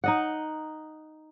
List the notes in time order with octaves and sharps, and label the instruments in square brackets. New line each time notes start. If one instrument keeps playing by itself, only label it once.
[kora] D#4 D#5 F#5